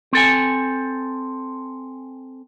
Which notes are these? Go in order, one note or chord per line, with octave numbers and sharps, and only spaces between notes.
C4 A4 G#5